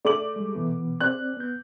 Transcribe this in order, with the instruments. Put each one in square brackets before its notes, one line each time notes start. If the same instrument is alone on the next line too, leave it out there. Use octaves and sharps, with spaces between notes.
[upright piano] A3 D6 F#7 [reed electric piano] D5
[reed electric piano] G3 G#3
B2 E3 B3
[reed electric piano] C4 D5 [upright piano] F#6
[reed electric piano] B3 G6